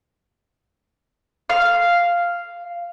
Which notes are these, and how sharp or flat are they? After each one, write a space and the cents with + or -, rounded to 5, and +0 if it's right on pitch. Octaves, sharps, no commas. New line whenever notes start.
F5 -5